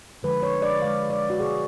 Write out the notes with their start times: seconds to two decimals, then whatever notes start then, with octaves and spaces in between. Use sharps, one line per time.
0.23 D3 F3 G#3 B4
0.43 C#5
0.62 D5
0.82 D3 G#3 F5
1.10 D5
1.30 F#4
1.39 B2 G#3 G#4